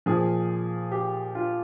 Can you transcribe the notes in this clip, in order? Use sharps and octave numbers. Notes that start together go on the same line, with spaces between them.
A#2 F3 G#4
G4
F4